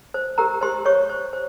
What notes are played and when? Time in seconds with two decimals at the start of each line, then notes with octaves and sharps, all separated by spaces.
0.14 C5
0.38 G4 A#4 A#5
0.62 G4 C5 C6
0.85 G4 C#5 C#6
1.10 C5
1.33 C5